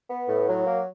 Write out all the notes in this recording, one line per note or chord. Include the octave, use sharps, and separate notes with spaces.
B3
A2
F#3
A#3